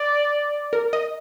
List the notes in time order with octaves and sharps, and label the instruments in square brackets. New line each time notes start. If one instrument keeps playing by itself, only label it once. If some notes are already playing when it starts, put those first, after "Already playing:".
Already playing: [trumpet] D5
[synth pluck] A#4
D#5